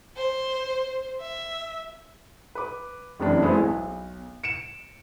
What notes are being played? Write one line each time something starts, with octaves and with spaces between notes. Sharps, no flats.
C5
E5
B4 D6
F1 F#2 E3 D4
G#3 A3 B3 C4 E4 G#4
B1
C#7 D7 E7